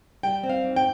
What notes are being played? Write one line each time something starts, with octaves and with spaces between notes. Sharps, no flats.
G3 G5
C4
F5
G#2
G5